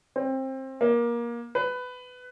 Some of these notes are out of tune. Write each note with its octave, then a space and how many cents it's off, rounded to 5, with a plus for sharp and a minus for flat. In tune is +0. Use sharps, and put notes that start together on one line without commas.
C4 +20
A#3 +20
B4 +15